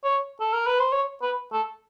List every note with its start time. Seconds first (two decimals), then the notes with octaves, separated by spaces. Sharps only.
0.04 C#5
0.40 A4
0.53 A#4
0.67 B4
0.79 C5
0.93 C#5
1.22 B4
1.53 A4